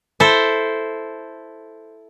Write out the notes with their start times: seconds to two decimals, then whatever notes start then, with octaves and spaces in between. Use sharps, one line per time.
0.20 E4 A4 C5